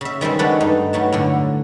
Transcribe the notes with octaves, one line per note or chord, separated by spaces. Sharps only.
C#3 E5
D#3 G3 G#3 C4
G#3 A3 D4 F#4 A4 B4
G2 D#4
G2 F#3 A3 A5
A2 D3